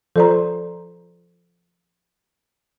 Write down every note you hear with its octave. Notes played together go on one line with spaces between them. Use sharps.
F3 A4 C5 D5 A#5